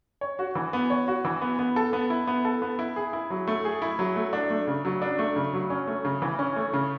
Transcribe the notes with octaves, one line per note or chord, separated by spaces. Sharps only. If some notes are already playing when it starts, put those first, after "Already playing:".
C#5
F#4
E3
B3
C#5
F#4
E3
B3
B3
A4
B3
E4
B3
A4
B3
E4
G#4
E4
F#3
A3
G#4
E4
F#3
A3
D4
A3
C#3
F#3
D4
A3
C#3
F#3
C#4
A3
C#3
E3
C#4
A3
C#3